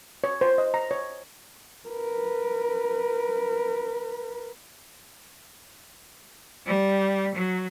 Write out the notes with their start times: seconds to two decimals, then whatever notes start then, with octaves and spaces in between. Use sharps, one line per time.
0.24 C#5
0.41 C5
0.58 D#5
0.74 A#5
0.91 C#5
1.89 A#4 B4
6.67 G3
7.35 F#3